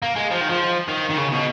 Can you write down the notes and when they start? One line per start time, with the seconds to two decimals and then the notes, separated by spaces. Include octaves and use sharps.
0.02 A#3
0.16 G#3
0.31 F3
0.41 D#3
0.50 F3
0.88 D#3
1.09 D#3
1.17 C#3
1.32 B2